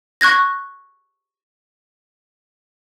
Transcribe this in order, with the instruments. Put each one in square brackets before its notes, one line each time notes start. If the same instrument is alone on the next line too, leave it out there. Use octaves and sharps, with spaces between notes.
[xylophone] C#6 F#6 G#6 A#6